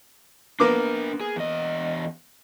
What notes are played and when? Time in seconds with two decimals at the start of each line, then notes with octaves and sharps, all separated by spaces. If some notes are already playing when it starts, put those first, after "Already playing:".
0.60 A#3 B3 D4 A#4 D6
1.21 G#4
1.36 E2 D#5